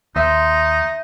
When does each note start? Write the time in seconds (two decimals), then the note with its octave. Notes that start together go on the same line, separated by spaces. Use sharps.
0.16 D#2 D#4 E5 C6